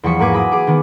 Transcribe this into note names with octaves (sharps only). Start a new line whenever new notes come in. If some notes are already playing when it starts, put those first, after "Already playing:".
E2 F3 G3 C#6 B6 C#7
G#2 A#3 A#4 B4 G#5 D6
F#3 B5 D#6
G#4 D6
D#3 B3